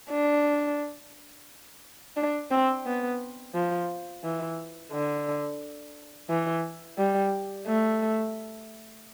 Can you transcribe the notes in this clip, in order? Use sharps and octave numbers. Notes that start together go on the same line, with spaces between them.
D4
D4
C4
B3
F3
E3
D3
E3
G3
A3